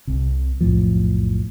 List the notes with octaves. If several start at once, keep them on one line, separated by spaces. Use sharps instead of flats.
C2 C3
B1 F2 A2 F3